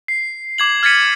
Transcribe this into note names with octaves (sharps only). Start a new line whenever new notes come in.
C7
D6 G#6 F#7
F6 G#6 A6 B6 C#7 D#7